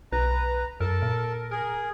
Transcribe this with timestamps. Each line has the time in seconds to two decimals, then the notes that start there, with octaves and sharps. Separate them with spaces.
0.12 B1 B4 A#5
0.80 F#2 A4 A#4 A5
1.02 A#2
1.51 G#4 A#4